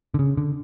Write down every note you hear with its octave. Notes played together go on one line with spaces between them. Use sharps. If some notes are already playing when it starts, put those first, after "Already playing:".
D3
C#3
D3